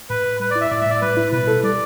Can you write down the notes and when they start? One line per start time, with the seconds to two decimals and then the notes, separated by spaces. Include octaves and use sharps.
0.10 A2 B4
0.26 A2
0.40 G3 B4
0.50 D5
0.56 E4
0.61 E5
0.71 A2 D5
0.81 E5
0.86 A2 D5
1.02 G3 B4
1.17 E4
1.32 B2 B4
1.48 A4
1.63 G3 D5